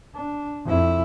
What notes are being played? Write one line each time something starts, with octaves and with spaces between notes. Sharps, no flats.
D4
F2 E4